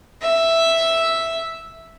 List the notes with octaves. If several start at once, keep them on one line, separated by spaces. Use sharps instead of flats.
E5